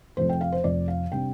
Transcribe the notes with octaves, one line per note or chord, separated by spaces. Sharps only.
F1 F2 F3 C5
G5
F5
C5
F1 F2 F3 D5
F5
C3 G3 D4 G5